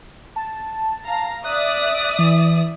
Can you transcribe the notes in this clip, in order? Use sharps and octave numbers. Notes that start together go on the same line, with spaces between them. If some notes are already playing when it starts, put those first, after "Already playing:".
A5
F5 A#5
D5 E5 D#6 F#6
E3